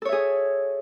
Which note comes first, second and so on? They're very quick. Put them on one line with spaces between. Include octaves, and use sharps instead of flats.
A4 C#5 E5 G#4